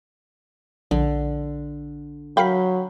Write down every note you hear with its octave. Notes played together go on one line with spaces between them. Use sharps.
A#1 D3
F#3 A#4 F5 G5 B5 B6